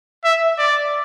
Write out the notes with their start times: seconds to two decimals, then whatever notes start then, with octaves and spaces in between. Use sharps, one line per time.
0.24 E5
0.58 D5